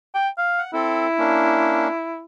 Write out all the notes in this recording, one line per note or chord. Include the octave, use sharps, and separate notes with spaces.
G5
F5
F#5
C4 E4 A4
A#3 C#4 D4